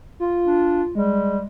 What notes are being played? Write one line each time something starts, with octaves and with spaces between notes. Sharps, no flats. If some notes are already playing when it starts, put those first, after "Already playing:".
F4
D4
G3 G#3